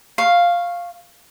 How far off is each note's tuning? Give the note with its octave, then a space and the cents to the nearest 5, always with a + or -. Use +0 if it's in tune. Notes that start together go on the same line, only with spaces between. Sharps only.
F5 +0 C#6 -15